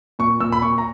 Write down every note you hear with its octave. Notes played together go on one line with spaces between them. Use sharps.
A#2 C#6
A#2 E6
B5
A#2 C#6
A#5